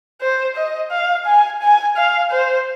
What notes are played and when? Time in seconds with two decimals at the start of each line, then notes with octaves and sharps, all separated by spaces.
0.21 C5
0.56 D#5
0.91 F5
1.26 G#5
1.62 G#5
1.97 F5
2.32 C5